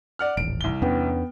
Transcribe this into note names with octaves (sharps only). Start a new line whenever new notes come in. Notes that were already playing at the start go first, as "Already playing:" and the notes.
D5 F#5 F6
D#1 A1 D7
C2 G7
E2 B3 C#4 D4 G5